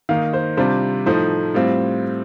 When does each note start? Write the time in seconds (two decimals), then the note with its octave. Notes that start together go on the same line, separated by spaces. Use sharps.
0.09 D#3 A#3 D#4 F5
0.33 C5
0.57 C3 G3 D4 F4 C5
1.06 A2 F3 A3 D#4 C5
1.54 A2 G3 C4 F4